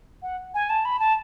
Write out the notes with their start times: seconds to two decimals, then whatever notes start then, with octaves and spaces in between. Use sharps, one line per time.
0.22 F#5
0.54 G#5
0.70 A5
0.85 B5
1.00 A5